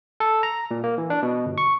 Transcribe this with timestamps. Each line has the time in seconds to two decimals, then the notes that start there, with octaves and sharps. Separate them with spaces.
0.20 A4
0.43 A#5
0.71 A#2
0.84 A#3
0.98 E3
1.10 D4
1.23 B2
1.46 G1
1.58 C#6